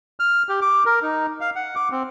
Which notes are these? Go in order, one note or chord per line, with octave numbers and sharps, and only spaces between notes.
F6
G4
D6
A#4
D#4
F5
F#5
D6
C4